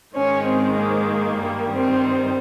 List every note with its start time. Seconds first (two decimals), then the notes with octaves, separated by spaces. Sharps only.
0.14 G#2 D#3 G#3 C#4
0.46 C4
0.78 A#3
1.40 G2 D#3 G3
1.71 C4